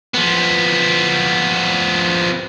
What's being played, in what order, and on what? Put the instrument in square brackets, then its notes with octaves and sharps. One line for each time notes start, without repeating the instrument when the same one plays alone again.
[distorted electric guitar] F3 B3